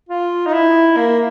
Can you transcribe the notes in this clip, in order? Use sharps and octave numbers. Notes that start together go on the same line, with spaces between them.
F4
D#4
E4
A#3